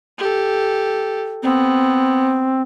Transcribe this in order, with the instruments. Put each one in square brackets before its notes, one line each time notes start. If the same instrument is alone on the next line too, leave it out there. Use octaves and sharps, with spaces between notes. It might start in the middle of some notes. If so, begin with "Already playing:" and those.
[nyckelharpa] G4 A4
[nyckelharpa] B3 [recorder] C4